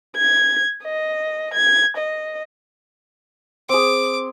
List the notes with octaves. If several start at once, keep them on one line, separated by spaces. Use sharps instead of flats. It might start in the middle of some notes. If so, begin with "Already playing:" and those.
G#6
D#5
G#6
D#5
C4 G#4 D6